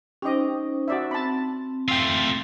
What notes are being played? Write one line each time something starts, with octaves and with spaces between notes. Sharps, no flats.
C#4 D#4 G4 C5 D#5
F#4 D5 E5
C4 A5 B5
A3 F4 G5 E6